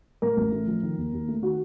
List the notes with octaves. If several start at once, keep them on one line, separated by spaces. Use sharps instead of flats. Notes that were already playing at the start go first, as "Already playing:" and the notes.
A2 A#4
A1
A3
F3
D#3
D#2
D#2
A3
D#3 F#4